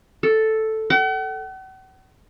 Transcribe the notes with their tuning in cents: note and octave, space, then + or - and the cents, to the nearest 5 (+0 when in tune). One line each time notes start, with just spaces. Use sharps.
A4 +0
F#5 +45